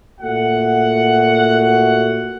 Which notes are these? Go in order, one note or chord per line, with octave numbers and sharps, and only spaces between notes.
A#2 A3 F#4 F#5